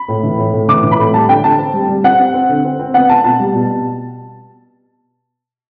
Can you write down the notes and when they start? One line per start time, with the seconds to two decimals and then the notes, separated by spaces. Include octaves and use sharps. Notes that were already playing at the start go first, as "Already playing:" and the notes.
Already playing: B5
0.08 A2
0.24 E3
0.38 A2
0.53 A2
0.69 E3 D6
0.84 E3
0.91 B5
0.99 A2
1.14 G3 A5
1.29 D3 G5
1.44 D3 A5
1.59 C4
1.74 G3
1.89 G3
2.04 C4 F#5
2.20 C4
2.34 C4
2.49 D3
2.65 C4
2.79 C4
2.94 B3 F#5
3.09 B3 A5
3.24 B2 A5
3.40 G3
3.55 B2